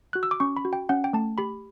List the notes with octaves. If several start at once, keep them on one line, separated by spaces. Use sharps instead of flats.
F#4 F#6
E6
D6
C#4 C#6
B5
F#4
G5
C#4 F#5
G5
A3 A5
G4 B5